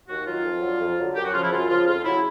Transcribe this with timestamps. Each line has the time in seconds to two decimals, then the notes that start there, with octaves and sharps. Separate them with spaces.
0.09 D#2 F#4
0.27 D#3 F#3 F4
0.44 F2
0.62 D3 F#3
0.80 F2
0.99 D3 F#3
1.15 F#2 G4
1.24 F#4
1.34 C#3 F3 F4
1.43 E4
1.52 F#2 F4
1.69 C#3 F3 F4
1.87 F2 F4
2.04 C#3 F#3 E4